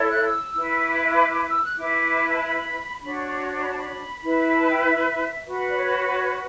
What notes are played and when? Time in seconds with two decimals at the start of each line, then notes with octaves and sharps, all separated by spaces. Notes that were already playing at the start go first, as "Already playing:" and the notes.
Already playing: E4 A4 C#5
0.08 F#6
0.23 E6
0.54 E4 B4
0.76 E6
0.85 D6
1.46 E6
1.62 F#6
1.77 E4 B4 D6
2.29 A5
2.38 B5
3.01 D4 F#4 C#5 B5
3.15 C#6
3.30 C#6
3.47 C#6
3.62 B5
3.68 A5
3.75 B5
4.23 E4 B4
4.54 A5
4.69 G5
4.85 E5
5.46 F#4 B4
5.68 D5
5.77 C#5